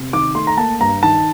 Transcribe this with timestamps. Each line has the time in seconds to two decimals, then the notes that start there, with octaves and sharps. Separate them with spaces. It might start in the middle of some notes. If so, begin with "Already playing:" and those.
Already playing: C3
0.13 D#3 D6
0.35 A3 C6
0.47 A#5
0.57 A#3 A5
0.80 G2 A#5
1.03 D#3 A5